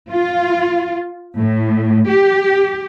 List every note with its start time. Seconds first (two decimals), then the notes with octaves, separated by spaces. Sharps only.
0.11 F4
1.38 A2
2.09 G4